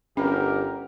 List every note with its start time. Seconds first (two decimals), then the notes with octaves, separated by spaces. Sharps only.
0.17 G1 C#4 G4 A#4